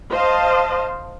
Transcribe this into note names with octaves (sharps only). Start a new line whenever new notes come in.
C5 D#5 F5 A5